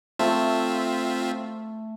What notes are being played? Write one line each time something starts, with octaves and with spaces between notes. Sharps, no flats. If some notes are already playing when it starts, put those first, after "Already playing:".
A3 C4 F4 E5